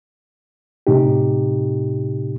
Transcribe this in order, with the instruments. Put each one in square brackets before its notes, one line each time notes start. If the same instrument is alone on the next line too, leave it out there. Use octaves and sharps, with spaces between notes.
[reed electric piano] A2 C3 D#4 G4